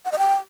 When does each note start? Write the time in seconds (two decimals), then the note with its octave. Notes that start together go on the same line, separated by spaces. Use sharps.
0.05 F#5
0.12 D#5
0.18 G5